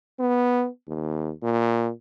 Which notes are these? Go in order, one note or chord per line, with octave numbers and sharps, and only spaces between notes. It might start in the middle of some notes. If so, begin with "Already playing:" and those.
B3
D#2
A#2